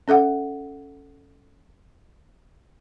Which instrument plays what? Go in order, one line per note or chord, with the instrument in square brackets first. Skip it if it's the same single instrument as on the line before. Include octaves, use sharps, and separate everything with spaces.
[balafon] C#4 A4 E5 F#5